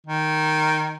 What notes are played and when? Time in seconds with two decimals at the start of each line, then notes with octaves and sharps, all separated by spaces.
0.06 D#3